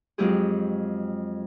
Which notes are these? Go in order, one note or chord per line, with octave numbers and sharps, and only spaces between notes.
F2 F#3 G#3 D#4 G4 G#4